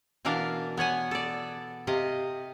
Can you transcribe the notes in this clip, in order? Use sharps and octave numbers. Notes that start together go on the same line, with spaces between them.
B2 E3 D4 A#4 F5
B3 C#5 F#5 G#5
A4 D5
C3 D#5 F5